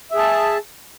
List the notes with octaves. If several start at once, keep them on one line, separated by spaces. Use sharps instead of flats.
G#4 E5 A5